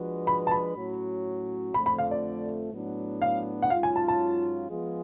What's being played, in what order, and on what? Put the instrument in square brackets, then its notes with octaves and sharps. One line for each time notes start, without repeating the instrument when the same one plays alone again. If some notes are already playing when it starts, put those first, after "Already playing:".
Already playing: [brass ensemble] F3 G#3 D4 F#4 B4
[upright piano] B5
A5
B5
[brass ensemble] A2 F#3 C#4 F#4
[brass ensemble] F2 D3 F3 A3 [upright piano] B5
[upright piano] B5
F5
D5
[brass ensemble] A2 F#3 B3 D4
[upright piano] F5
F#5
[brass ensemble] G#2 F#3 C#4 F4 [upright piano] F5
[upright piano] G#5
A5
A5
[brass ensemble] F3 G#3 B3 F4 G#4